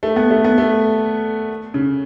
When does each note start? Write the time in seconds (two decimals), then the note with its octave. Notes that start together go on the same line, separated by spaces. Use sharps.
0.03 A3
0.16 B3
0.30 A3
0.44 B3
0.58 A3
1.74 C#3